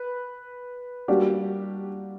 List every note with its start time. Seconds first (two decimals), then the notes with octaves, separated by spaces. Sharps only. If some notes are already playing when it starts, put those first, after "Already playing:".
Already playing: B4
1.08 G3 A#3 D4 F#4 G4